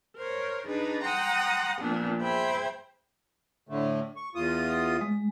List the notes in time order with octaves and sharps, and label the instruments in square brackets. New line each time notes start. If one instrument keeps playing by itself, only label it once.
[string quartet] A#4 C5 C#5
D4 D#4 G#4 B4
F#5 G5 A#5 C6 D#6
A#2 F3 B3 D4
G#4 C5 E5 G5 B5 G#6
[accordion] A2 D3 A3
C#6
E2 F4 D#6
[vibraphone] G#3